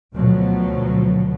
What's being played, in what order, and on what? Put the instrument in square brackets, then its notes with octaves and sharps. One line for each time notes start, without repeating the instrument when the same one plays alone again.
[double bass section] D2 B2 F3 F#3